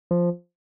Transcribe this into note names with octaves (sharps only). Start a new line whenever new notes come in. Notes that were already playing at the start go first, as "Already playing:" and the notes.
F3